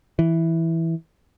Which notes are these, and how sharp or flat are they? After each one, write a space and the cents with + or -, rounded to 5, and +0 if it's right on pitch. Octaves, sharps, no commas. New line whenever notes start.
E3 -5